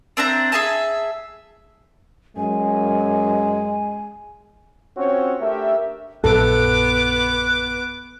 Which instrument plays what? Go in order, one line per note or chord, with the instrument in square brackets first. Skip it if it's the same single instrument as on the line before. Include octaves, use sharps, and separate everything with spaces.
[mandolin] C4 D4 E5 A#5
G#4 E5 G#5 A5
[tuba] F#2 [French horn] G#3 [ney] G#5
[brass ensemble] C4 C#4 F4 F#4 C5 C#5
A3 D4 G4 A#4 E5
[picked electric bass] A#1 F#2 [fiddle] B3 D6 [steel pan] A4 [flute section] F#6